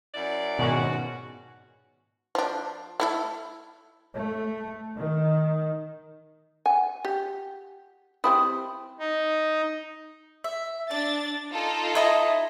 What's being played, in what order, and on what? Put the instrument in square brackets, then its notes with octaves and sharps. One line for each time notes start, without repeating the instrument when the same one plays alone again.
[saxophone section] F#2 E4 D5
[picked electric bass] G#2 B2 [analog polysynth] D#3 G#3 C#4 [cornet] F#4
[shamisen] F3 D4
A3 E4 A4
[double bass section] A3
D#3
[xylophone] F#5 [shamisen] G#5
[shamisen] G4
[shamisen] G3 C4 E4 [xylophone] B5 D#6
[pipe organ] D#4
[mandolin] E5
[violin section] D4 A6 [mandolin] D5
[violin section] D#4 F4 A4
[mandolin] E4 D#5 A#5